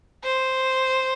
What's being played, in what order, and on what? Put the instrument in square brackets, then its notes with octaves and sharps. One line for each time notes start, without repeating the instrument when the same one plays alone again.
[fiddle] C5